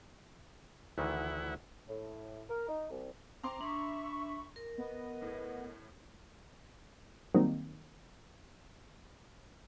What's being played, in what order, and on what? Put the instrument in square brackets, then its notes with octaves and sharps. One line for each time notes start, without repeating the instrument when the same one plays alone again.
[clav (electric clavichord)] D2 D#3 E3 [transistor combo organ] E4 F#5
[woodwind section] A2
A#4
D#4
C2
[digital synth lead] C4 [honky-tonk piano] A#5 C6 D6
[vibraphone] D4 [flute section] E5 C#6 [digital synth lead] B5
[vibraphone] A#4
[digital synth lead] B3 [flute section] D#5
[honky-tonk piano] A2
[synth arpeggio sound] D#3 F#3 G3 A#3 C4 D#4